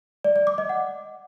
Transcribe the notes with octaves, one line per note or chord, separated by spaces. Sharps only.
D5
D5
D6
D#5
F#5